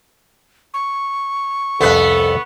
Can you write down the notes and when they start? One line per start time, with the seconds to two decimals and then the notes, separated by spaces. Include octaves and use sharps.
0.74 C#6
1.81 C2 F2 B3 A4 B4